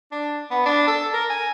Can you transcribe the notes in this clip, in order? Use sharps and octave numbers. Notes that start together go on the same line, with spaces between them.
D4
B3
D4
A4
A#4
G#5